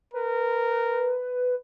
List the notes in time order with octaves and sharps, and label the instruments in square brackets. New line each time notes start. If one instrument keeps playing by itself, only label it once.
[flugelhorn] A#4 [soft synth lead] B4